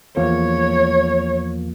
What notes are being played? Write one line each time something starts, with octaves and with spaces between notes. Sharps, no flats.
E2 F3 A#3 C#5